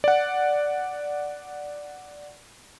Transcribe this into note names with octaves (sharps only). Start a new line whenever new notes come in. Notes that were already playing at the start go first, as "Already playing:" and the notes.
D5 F#5